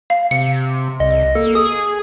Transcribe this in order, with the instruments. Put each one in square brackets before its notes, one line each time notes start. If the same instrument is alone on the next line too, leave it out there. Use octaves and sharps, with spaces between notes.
[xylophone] F5
[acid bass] C3 [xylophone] C#7
[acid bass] C2 [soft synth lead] D#5
[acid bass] A#3 [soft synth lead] A4
[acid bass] G#4 [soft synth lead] D#6